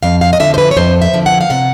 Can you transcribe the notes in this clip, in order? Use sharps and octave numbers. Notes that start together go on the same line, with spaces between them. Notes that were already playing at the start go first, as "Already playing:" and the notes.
F2 F5
F5
D#5
D3 F3 E5
C5
B4
C#5
F2 C5
E5
D3 F3
F#5
F5
C3 F#5